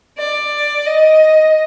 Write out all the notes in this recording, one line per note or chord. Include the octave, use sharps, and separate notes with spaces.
D5
D#5